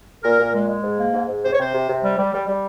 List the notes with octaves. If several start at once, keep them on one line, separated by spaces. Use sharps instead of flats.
A#2 A#4
A#2
G#3
G#3
G#2
A#3
G#2
G#2
C3 C5
C#5
C3 C5
C3
C3
G3
G3
G3
G3